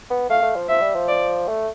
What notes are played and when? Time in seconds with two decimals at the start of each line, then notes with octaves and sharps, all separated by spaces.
0.10 B3
0.30 A3 F5
0.43 A3
0.56 F3
0.69 F3 E5
0.82 G3
0.96 F3
1.08 D5
1.48 A3